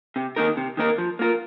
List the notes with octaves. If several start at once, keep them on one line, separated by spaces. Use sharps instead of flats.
C3
D#3 A#3 D#4 A#4
C3
D#3 A#3 D#4 A#4
F3
A#3 F4 A#4